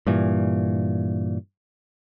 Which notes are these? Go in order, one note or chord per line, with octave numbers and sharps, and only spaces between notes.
G2 A#2 E3